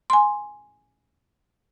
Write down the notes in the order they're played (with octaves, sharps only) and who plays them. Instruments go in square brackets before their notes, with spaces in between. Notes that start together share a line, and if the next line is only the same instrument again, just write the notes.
[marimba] G#5 C6